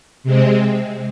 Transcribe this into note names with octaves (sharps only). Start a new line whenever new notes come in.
C3 G#3 C4